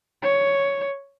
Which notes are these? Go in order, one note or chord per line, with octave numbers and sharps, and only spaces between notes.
C#5